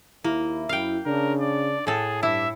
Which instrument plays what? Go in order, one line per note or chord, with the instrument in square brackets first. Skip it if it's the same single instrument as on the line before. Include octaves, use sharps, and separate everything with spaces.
[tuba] D#2 [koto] A#3 [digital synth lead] E4
[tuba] F#2 [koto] F5 G5
[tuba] C#3 [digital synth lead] D4 [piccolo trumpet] A#4
[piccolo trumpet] D5
[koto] A2 A4 [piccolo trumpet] G#4
[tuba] G2 [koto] E4 [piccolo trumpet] E5 [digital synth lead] D6